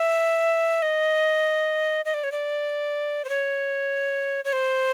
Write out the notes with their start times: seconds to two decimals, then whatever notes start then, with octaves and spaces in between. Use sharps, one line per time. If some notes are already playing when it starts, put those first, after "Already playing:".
Already playing: E5
0.82 D#5
2.05 D#5
2.14 D5
2.23 C#5
2.32 D5
3.25 C5
3.29 C#5
4.45 C#5
4.53 C5